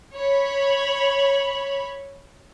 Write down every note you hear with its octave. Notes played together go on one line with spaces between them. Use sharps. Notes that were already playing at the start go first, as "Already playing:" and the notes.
C#5 B5